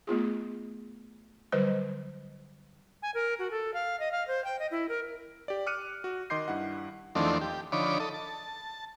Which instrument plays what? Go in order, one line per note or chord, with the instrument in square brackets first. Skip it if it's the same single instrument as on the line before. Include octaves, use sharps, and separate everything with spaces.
[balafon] A3 B3 F4 G#4
D3 F#3 G3 B4 C5 D#5
[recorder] G#5
A#4
F#4
A4
F5
D#5
F5
C5
G5
D#5
E4
A#4
[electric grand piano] G4 D5
D6 F6 F#6 C#7 D#7
F#4
D#3 D#5 C6 D6 G6 C7
G2 E4 F#5
[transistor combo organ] E2 D#3 F3 A3 C4 D4
G4
D3 F3 D#4 C#5 B5 D6
A4 D#5
A5